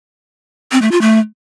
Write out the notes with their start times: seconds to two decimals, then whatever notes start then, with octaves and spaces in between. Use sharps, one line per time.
0.72 C4
0.82 A3
0.92 F4
1.01 A3